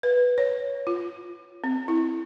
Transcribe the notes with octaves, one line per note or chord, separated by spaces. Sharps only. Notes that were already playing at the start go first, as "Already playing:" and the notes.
B4
C#5
F4
C4
E4